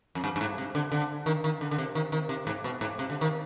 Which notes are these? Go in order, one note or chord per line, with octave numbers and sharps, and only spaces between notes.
F2
G2
G2
G#2
C3
D3
D3
D#3
D#3
D3
D3
C3
D#3
D#3
C3
G#2
B2
G#2
C3
D3
D#3